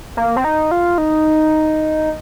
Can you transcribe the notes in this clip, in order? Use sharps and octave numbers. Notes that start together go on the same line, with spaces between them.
A#3
C4
D#4
F4
D#4